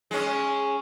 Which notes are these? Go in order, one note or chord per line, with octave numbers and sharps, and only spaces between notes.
G#3 C#4